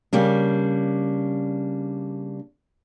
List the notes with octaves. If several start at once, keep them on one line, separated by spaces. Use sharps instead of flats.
C#3 G3 A#3 D4